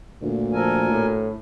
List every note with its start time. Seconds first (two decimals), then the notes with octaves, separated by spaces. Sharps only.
0.22 D2 A#2
0.53 F3 A4 A#4 G#5
0.90 A2